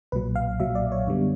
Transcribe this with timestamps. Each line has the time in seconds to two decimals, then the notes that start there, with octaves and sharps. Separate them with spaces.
0.12 B1 A#2 F#3 B4
0.36 F5
0.60 B1 A#2 F#3 E5
0.75 D5
0.92 C#5
1.07 F#2 D3 G3 B3